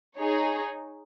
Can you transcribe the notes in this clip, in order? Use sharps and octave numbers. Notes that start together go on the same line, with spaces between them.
D#4 G#4 C#5